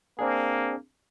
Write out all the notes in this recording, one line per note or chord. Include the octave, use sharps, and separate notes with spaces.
A#3 C4 D4 G#4